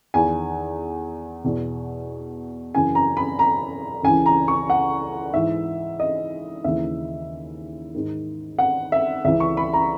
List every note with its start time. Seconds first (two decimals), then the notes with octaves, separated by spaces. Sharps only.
0.14 E2 D#3 G#5
1.44 E2 B2
2.74 F#2 C#3 E3 G#5
2.95 A#5
3.17 B5
3.39 A#5
4.03 C#2 C#3 E3 G#5
4.26 A#5
4.48 C#6
4.70 F#5
5.34 G#2 E3 E5
6.00 D#5
6.64 D#2 C#3 E3 E5
7.95 G#2 D#3
8.58 F#5
8.92 E5
9.25 C#2 C#3 E3 E5
9.40 C#6
9.57 B5
9.73 A#5